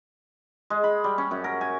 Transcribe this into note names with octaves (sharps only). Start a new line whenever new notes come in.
G#3
B5
G3
C#4
F#2
A#4
G#5